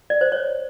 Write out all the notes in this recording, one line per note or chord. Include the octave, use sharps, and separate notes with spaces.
D5
C5
C#5